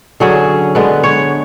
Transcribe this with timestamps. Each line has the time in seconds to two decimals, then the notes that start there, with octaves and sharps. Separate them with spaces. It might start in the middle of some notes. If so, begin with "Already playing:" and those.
0.20 D3 F#3 C#4 G#4
0.75 D3 G#3 B3 B4
1.03 C#5